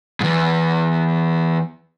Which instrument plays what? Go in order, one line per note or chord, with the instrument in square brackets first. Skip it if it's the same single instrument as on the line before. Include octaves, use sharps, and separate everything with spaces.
[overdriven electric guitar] E2 G#2